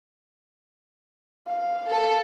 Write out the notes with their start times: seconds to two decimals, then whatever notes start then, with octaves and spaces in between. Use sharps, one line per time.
1.47 F5
1.88 A4